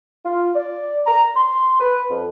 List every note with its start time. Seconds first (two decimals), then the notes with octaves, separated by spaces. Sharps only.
0.25 F4
0.54 D5
1.06 A#5
1.36 C6
1.80 B4
2.09 F2